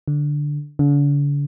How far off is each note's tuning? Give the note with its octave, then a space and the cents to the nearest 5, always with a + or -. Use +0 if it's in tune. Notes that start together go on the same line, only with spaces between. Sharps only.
D3 +0
D3 -40